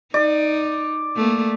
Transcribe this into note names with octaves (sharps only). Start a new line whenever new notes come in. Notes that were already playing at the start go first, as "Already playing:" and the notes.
D#4 D5
A3 A#3